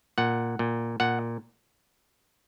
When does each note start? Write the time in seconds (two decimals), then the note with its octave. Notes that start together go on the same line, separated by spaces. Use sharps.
0.18 A#2 F#5
0.59 A#2
1.00 A#2 F#5